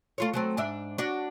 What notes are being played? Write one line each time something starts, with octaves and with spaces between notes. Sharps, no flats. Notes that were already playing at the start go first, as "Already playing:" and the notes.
A3 F4 C#5
F#3 A3 C4
G#2 D4 E5
D4 F#4